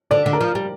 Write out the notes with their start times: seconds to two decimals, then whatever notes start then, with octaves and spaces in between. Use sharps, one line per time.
0.11 D3 D5
0.26 D3
0.33 A#4
0.41 F3
0.55 G3